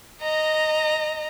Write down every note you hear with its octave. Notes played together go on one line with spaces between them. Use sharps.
D#5 A#5